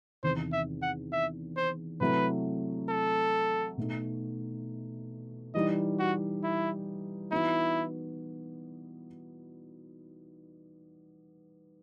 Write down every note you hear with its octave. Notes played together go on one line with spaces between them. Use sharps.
E2 C3 D#3 C5
E5
F#5
E5
C5
C3 F#3 A3 E4 B4
A4
B2 A3 D#4
E3 G3 D#4 D#5
F#4
E4
E3 B3 D#4 E4 F#4